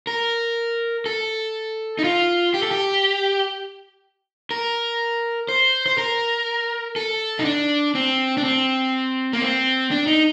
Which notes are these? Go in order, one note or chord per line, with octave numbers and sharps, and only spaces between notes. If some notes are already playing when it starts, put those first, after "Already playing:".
A#4
A4
D#4
F4
G4
A4
G4
A#4
C5
C5
A#4
A4
D#4
D4
C4
D4
C4
A#3
C4
D4
D#4